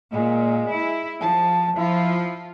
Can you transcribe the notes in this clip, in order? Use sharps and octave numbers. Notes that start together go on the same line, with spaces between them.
A#2 G#3
E4
F3 A5
F3 E4 F4